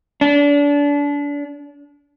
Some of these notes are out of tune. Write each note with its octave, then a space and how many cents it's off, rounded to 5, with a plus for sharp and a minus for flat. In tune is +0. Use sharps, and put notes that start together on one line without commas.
D4 -30